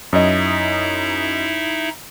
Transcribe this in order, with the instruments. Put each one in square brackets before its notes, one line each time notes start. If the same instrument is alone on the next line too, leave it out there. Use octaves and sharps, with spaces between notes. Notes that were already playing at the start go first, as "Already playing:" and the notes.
[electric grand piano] F#2 D#5 [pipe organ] D#4 E4 E5